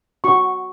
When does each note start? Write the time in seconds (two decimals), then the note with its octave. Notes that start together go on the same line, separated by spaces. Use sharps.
0.24 F#4 C#6